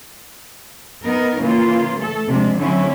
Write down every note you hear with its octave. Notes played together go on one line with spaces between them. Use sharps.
B3 D#4 A#4
C#3 E3 A#3 F4
A3 A4
C3 F3 G#3 D4
D3 F#3 A3 C4 C#4 E4